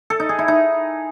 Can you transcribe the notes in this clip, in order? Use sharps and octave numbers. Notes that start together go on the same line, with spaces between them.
A4
D#4
G#4
E4
D#4